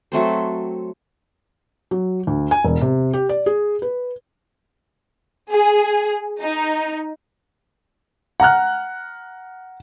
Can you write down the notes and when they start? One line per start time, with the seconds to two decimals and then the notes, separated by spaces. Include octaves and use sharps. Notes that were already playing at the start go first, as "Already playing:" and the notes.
0.12 F#3 A3 C4 C5
1.91 F#3
2.27 D2
2.51 G#5
2.65 E1
2.81 C3
3.14 G4
3.29 D5
3.46 G#4
3.82 B4
5.51 G#4
6.41 D#4
8.40 F#5 A#5 F6 F#6